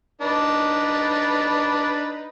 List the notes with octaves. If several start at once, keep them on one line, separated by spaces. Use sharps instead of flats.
D4 D#4 B4